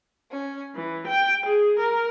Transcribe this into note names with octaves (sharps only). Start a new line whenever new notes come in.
C#4
E3
G5
G#4
A#4